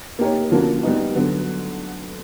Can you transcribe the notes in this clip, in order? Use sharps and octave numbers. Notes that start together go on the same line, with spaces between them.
A#3 D#4 G4 A#4 C#5
D3 F3 A#3 C#4 F#4
G3 B3 D#4
D3 F#3 B3